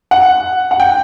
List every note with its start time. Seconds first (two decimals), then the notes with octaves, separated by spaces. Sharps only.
0.11 F#5
0.71 F#5
0.80 G5